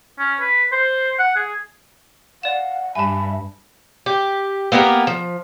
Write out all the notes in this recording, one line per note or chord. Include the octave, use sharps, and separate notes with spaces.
C#4
B4
C5
F#5
G#4
D5 F5 F#5 E7
G2 E5 G#5 A5 B5
G4
A#3 B3 G4 A#4
F3